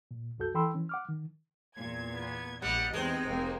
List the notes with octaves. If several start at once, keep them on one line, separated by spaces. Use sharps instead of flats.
A#2
C2 F#2 F#4 A4 G6
E3 A4 G5 B5 C6 E6
E3 C#4
F#5 D6 F6
D#3
E2 A#2 G#6
B3
A#1 G3 D#5 F#5
E2 G#3 C4 D#4
F1 A#3 C4